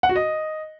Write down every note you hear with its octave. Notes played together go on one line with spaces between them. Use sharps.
F#5
F#4
D#5